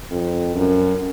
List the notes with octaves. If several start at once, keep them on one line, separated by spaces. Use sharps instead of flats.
F2
F#2